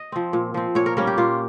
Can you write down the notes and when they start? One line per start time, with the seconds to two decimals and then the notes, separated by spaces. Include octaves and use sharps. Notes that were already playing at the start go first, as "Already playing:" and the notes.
Already playing: D#5
0.12 F3 C4
0.33 A#2
0.54 F3 C4
0.75 A#2 C#5
0.86 A#4
0.97 G3 A#3 C#4 A#4
1.07 G4
1.18 A#2 F4